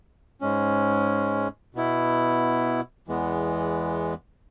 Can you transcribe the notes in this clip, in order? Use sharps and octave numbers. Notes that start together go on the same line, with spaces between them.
G#2 G#3 C#4
B2 B3 E4
E2 E3 G#3 B3